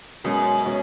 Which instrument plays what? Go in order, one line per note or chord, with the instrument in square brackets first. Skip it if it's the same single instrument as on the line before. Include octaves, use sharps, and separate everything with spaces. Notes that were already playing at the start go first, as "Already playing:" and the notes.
[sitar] F#2 [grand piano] B2 G#3 C#4
[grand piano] B2 G#3 C#4